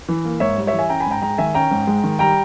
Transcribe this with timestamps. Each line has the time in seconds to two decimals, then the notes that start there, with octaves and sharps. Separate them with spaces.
0.08 E3
0.24 A#3
0.40 G#2 C#5 E5
0.57 G3
0.67 C#5 E5
0.73 E3
0.79 E5 G#5
0.89 C#4 G5 A#5
1.00 G#5 B5
1.06 G#2 G5 A#5
1.22 G#3 G5 A#5
1.38 D#3 E5 G#5
1.54 C#4 G5 A#5
1.71 G#2
1.87 G#3
2.04 D#3
2.19 G3 G5 A#5